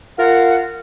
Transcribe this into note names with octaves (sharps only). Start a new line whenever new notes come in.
F4 A#4 F5 F#5